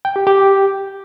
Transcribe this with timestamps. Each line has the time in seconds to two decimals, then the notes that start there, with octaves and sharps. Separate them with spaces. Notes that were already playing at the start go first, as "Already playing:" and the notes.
0.05 G5
0.16 G4
0.27 G4